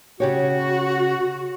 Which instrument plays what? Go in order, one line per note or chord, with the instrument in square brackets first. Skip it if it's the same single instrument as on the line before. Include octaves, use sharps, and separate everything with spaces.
[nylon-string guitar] C#3 G4 C#5 [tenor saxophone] F#4